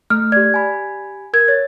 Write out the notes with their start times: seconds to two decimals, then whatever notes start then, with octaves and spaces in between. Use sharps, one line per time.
0.10 A3 F6
0.32 G4 D5 G#6
0.54 G#5 B5
1.33 A#4 G#6
1.48 C#5 A6